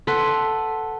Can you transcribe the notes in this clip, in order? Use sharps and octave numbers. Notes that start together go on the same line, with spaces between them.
A4 B4 F#5 C6